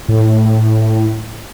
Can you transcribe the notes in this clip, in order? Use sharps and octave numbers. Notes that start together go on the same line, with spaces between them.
A2